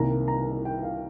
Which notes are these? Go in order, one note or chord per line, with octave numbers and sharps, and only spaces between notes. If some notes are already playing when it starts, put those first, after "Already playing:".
Already playing: C2 C3 D#3 A#3 A#5
A#5
G5
F5